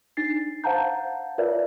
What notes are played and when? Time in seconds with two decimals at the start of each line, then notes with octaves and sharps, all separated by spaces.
0.17 D4 D#4 A6 C7
0.64 C5 F5 F#5 A5 A#5 G6
1.38 F4 A#4 B4 C#5 D5 E5